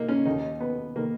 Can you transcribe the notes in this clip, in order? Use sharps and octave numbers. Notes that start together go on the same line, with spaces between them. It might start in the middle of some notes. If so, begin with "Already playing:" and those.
Already playing: A#2 A#3 D#4
C#4
D#2 D#3 D#4
B3
D#3 A#3